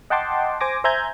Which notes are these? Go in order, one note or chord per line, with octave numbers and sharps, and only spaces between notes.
D#5 F#5 G5 A5 C6 D6
C5 G#5 D6 A#6
C5 E5 G#5 A#5 G6 G#6